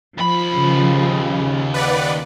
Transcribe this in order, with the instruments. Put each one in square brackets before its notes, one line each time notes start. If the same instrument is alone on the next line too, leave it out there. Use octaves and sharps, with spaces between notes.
[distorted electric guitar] D#2 B5 [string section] F3
[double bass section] C#3
[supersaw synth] B4 D5 F#5